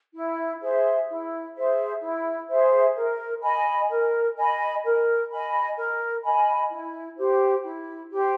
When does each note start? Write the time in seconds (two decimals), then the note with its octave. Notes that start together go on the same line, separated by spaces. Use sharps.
0.14 E4
0.61 G#4 C5 E5
1.08 E4
1.55 G#4 C5 E5
2.01 E4
2.49 G#4 C5 E5
2.96 A#4
3.42 D#5 G#5 B5
3.90 A#4
4.36 D#5 G#5 B5
4.83 A#4
5.30 D#5 G#5 B5
5.77 A#4
6.24 D#5 G#5 B5
6.70 E4
7.18 G4 C5
7.64 E4
8.11 G4 C5